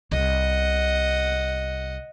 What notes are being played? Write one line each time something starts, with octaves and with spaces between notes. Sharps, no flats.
C2 D#5 F#5